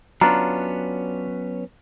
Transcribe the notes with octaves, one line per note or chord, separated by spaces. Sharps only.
F#3 B3 C#4 D4 F4 A#5